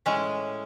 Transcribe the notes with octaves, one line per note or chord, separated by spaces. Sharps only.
A2 G#3 C#4